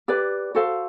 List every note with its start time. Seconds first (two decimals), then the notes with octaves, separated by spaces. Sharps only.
0.08 G4 B4 D5
0.55 F#4 A4 C5 F5